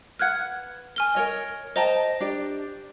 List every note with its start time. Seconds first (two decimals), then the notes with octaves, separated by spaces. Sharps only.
0.19 B4 F#5 F6 F#6 G#6
0.96 G#5 F6 G7
1.15 A#4 C#5 D#5
1.76 C5 D#5 G5 A5 A#5
2.20 D4 G4 D5